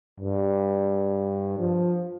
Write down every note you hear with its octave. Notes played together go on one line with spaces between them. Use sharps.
G2
F3